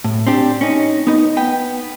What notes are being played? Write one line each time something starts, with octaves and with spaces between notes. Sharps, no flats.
A2
C4 D4 G4
C#4 D#4
B3 D#4
B3 G5